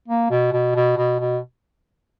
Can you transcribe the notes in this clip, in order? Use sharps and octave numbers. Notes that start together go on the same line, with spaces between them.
A#3
B2
B2
B2
B2
B2